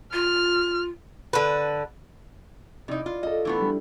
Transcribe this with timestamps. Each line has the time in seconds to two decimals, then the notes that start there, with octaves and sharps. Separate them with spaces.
0.13 F4 F6
1.33 D3 B4
2.88 C3 D#4 E4 D5
3.06 F4
3.23 F4 A4 D#5
3.45 E3 A3 B3 D4 E4
3.61 G3